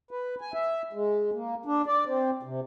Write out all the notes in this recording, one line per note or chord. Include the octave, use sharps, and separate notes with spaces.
B4
G#5
E5
G#3
A#3
D4
D5
C4
C3